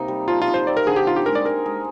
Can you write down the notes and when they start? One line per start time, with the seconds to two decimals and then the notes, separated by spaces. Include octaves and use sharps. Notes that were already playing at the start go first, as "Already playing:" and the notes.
Already playing: C3 A#3 C4 D#4
0.08 G3
0.28 F3 F4
0.42 F4
0.48 D#4
0.54 C5
0.67 C4 D5
0.77 A#4
0.87 D3 G#4
0.96 G4
1.07 D#4 F4
1.16 G4
1.26 G#3 A#4
1.35 D5
1.45 G#4 A#4
1.66 G#3